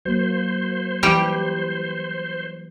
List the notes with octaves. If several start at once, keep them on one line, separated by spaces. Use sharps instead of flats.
F#3 A#3 C5
E3 G3 G4